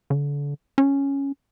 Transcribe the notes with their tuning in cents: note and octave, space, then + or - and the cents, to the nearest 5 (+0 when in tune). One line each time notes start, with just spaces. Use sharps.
D3 -35
C#4 +0